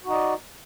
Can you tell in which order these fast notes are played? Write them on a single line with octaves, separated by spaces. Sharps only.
F#4 D#4 D#5 D5